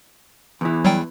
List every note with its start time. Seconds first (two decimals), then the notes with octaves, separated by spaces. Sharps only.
0.61 E2 E3
0.85 F#3 G3 G5